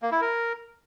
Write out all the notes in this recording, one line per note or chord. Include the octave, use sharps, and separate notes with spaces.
A#3
E4
A#4